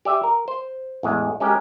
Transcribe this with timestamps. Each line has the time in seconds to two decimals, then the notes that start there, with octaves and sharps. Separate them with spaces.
0.05 G4 D5 E5
0.24 A#4
0.48 C5
1.03 A1 E2 G#3
1.40 G#3 C#4 G4 A#4